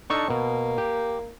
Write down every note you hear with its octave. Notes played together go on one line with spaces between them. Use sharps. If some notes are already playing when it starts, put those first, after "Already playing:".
D4 D#4 A4 C#6
B2 A#3
G4